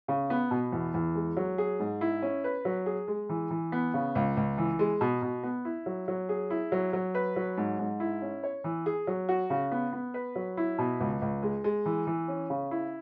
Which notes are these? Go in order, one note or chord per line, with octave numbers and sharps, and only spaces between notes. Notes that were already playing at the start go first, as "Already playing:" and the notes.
C#3
B3
B2
E2
E2
G#3
F#3
G#4
G#2
E4
C#4
B4
F#3
G#4
G#3
E3
E3
B3
C#3
C#2
C#2
E3
G#3
B2
B2
B3
E4
F#3
F#3
G#4
E4
F#3
F#3
B4
F#3
G#2
G#2
E4
C#4
C#5
E3
G#4
F#3
F#4
C#3
B3
B3
B4
F#3
E4
B2
C#2
C#2
G#3
G#3
E3
E3
C#4
C#3
E4